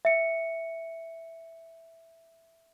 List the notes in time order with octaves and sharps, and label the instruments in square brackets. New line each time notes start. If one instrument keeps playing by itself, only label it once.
[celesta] E5 C#7